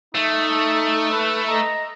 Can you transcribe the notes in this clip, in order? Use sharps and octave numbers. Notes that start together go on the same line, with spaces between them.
A3 D#4
B4
D#5 A#5